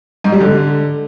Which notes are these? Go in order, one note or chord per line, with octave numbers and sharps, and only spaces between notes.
G#2
G3
D3